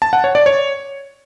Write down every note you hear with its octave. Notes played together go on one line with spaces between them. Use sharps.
A5
F#5
C#5
D5
C#5